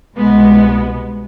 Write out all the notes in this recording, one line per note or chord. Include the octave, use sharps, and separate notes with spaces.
C2 B2 G#3 B3